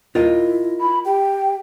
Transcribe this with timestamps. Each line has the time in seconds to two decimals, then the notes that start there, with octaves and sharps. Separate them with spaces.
0.15 E4 F4 A#4 D#5
0.80 B5
1.05 G4 G5